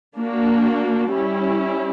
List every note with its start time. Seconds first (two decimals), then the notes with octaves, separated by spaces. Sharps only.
0.16 A#3 D4 F#4
1.11 G3 C#4 E4